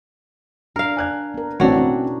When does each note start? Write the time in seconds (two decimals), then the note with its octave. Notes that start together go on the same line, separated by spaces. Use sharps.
0.76 D4 A#4 F5
0.97 G#5 F#6 G#6
1.34 B3 A#4
1.60 A1 B2 C4 D4 F#4 C#5
1.77 C4 C#4 E4